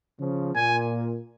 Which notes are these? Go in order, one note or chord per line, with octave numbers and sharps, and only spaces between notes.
C#3 F3
A#2 G#5